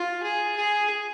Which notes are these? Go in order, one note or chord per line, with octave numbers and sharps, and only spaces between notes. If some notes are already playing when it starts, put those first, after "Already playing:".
Already playing: F4
G#4
G#4